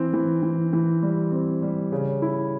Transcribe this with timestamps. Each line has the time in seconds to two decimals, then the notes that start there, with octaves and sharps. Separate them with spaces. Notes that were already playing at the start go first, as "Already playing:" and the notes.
Already playing: E3 C4
0.13 E3
0.43 E3
0.73 E3
1.03 G3
1.32 C4
1.62 G3
1.92 C#3
2.22 E4